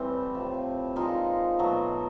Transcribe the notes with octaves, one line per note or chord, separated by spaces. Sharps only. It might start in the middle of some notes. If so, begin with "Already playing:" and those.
Already playing: A2 E3 G3 A3 C4
C3 F3 A3
A#2 F3 G#3 D#4 F4
B2 F#3 A3